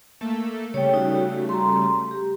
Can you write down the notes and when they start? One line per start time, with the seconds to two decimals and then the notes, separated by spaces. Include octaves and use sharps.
0.21 A3 A#3 A4
0.74 C#3 G3 A3 C#5 G5
0.94 D#4 F#4
1.15 F#4
1.49 A#5 C6
2.11 G4